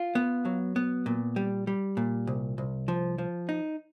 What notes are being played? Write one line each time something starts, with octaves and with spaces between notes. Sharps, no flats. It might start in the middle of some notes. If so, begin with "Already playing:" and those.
Already playing: F4
B3
F#3
B3
A#2
G3
G3
A#2
C2
C2
F3
F3
D#4